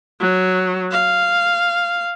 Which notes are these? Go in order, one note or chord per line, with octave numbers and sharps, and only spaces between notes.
F#3
F5